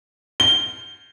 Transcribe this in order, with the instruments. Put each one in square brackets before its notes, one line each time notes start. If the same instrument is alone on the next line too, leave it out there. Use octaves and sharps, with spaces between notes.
[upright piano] G7